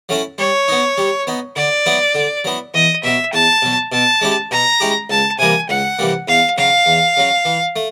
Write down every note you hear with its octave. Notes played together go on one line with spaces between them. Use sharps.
F#3 A3 C#4 E4
G3 C#5
B3 D#4
G3
B3 D#4
D3 D5
F#3 B3 E4
D3
F#3 B3 E4
E2 D#5
B2 F#3 E5
E2 A5
B2 F#3
B2 A5
G#3 C#4 E4 G4
B2 A#5
G#3 C#4 E4 G4
C#2 A5
C3 E3 G3 A#3 G#5
C#2 F#5
C3 E3 G3 A#3
E2 F5
C#3 F#3 F5
E2
C#3 F#3
E3
A3